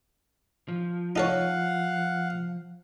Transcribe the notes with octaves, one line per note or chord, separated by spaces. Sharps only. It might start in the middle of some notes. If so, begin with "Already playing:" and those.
F3
D#4 A4 C#5 F5 F#5